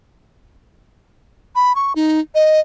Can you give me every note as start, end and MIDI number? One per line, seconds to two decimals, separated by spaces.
1.56 1.75 83
1.76 1.93 85
1.96 2.20 63
2.35 2.60 75